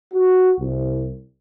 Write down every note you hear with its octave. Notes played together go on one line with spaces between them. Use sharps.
F#4
C2